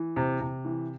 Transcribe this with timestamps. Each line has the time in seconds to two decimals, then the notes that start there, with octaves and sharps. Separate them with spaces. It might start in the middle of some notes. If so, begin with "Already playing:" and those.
Already playing: E3
0.16 C3
0.41 C3
0.65 E3